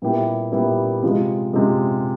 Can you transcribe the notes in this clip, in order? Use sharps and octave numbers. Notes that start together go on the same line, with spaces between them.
A#2 G3 B3 E4 G4
A#2 G3 B3 E4 G4
C3 F3 G#3
C3 F3 G#3